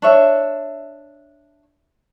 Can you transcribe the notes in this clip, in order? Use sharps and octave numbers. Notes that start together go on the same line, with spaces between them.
D4 C#5 E5